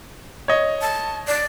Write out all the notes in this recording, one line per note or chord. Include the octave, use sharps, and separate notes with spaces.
C#5 D#5
A5
D5